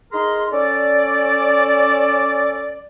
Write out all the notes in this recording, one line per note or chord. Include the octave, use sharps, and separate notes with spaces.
D#4 G#4 A#4 C6
C#4 A4 D5